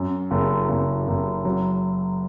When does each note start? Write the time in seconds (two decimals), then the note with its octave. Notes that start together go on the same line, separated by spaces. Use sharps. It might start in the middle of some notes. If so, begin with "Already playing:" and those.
Already playing: F#2
0.31 F#1
0.69 F#1
1.08 F#1
1.45 F#3